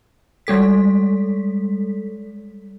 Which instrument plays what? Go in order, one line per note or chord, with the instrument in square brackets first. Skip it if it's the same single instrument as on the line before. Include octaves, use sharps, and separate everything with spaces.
[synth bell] G3 G#3 A4 B6